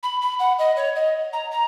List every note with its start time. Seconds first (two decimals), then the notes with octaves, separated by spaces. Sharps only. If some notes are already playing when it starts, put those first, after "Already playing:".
0.03 B5
0.22 B5
0.40 F#5
0.59 D#5
0.76 C#5
0.96 D#5
1.33 A#5
1.51 A#5